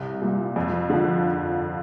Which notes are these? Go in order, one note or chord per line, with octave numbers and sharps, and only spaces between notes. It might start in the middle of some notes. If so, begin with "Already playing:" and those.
Already playing: C2
A#2 G3
F2
D3 F3